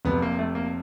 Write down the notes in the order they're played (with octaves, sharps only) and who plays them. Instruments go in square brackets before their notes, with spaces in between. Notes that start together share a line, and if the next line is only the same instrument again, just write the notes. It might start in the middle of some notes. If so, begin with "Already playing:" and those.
[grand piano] F1 F2 C3 [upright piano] B3
[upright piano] A#3
A3
A#3